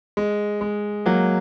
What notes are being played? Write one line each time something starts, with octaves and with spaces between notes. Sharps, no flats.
G#3
G#3
F#3 A#3